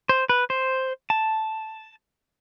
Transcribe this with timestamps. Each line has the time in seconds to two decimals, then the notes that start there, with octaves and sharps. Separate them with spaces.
0.09 C5
0.29 B4
0.50 C5
1.10 A5